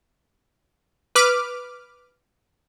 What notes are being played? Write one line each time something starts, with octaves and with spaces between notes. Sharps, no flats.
B4 D6 F6